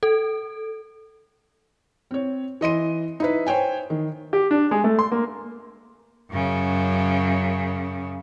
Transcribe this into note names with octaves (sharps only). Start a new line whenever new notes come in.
A4
C4 C#5
E3 D#5 C6 D#7
D#4 E4 B4
C5 C#5 G5 G#5
D#3
G4
D4
G#3
A3
C6
A#3
F#2 C#3